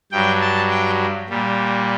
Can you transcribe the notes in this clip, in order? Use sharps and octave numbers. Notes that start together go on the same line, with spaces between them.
G2 F#3 G5
A5
G5
A#2 G3